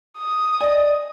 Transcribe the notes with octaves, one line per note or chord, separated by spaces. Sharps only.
D#6
D5 D#5 G#5